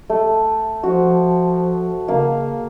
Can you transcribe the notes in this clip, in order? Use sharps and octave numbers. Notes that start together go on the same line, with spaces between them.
A3
F3 F#4
C#3 A#3 F5